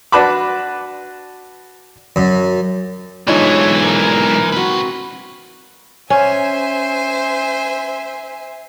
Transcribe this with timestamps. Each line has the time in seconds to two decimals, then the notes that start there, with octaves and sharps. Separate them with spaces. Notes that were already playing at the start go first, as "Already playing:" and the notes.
0.12 D4 F#4 B4 A5 B5 D6
2.16 F#2
3.28 B1 G#2 E3 D4 D#4 F4 C#5
3.84 A#4
4.52 C3 C4 F#4 B4
6.10 C#4 C5 E5 G#5